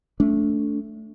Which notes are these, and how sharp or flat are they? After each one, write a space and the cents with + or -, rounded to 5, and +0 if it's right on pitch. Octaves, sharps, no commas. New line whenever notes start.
A3 +0 D4 -30